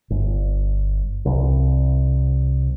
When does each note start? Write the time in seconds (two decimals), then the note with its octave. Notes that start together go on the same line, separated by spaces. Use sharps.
0.10 G1
1.25 C2